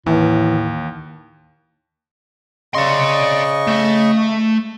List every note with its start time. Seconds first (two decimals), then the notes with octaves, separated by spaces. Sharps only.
0.06 D#2 A2 E3
2.75 C#3 D5 D#5 C6 C#6
3.67 A3